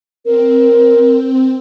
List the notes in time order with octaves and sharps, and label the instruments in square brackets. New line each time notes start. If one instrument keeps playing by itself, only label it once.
[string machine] C4 [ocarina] A#4